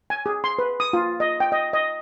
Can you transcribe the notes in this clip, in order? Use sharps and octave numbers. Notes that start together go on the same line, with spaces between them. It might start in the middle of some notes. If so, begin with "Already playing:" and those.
G#5
G#4
C6
B4
D#6
F4
D#5
G5
D#5
D#5